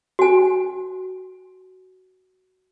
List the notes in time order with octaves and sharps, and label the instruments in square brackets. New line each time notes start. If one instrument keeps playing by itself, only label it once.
[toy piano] F#4 G#5